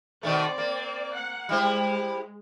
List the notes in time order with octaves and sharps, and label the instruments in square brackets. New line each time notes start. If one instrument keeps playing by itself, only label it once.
[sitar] B2 D#3 A3 [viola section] C4 D5
[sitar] A#3
[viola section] F#5
[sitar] G3 E4 C5 [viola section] G#3